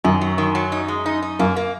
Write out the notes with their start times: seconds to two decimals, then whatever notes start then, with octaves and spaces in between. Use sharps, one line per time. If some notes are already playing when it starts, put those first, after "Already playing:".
0.04 F#2 D#3
0.21 F#3
0.38 D#3
0.55 F#3
0.72 D#4
0.88 G#3
1.06 D#4
1.23 D#4
1.39 F#2 A#3
1.56 A#3